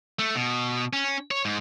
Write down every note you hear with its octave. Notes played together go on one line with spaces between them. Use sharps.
A3
B2
C#4
C#5
G#2